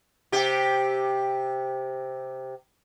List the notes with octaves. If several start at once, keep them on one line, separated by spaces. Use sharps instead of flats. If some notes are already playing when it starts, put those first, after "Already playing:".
C3 G4